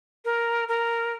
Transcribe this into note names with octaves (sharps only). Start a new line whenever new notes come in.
A#4
A#4